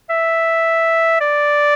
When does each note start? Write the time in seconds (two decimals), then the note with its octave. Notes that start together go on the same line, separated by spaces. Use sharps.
0.10 E5
1.21 D5